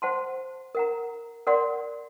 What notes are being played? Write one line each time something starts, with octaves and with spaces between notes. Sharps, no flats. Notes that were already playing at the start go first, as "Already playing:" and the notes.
C5 F#5 A5 C6
A#4 F#5 A#5
A#4 D5 F#5 C6